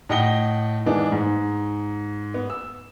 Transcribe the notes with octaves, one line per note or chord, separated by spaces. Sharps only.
A2 D#5 F#5 G5 A#6 G7
E3 G#3 A#3 B3 D4 D#4
G#2
B3
E6